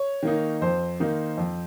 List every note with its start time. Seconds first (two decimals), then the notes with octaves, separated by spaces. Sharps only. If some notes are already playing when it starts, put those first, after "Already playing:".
Already playing: C#5
0.23 D#3 A#3 D#4
0.62 F2 C5
1.00 D#3 A#3 D#4
1.38 F2